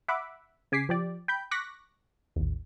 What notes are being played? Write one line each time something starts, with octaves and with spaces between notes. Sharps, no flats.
E5 F#5 B5 D6
C#3 G#5 D6 B6 C7
F3 G4 D5
G5 B5 G6
C#6 D6 F#6 A#6 B6
A1 D#2